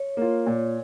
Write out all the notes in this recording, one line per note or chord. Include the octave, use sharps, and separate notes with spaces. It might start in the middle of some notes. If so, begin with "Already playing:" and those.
Already playing: C#5
A#3 F4
A#2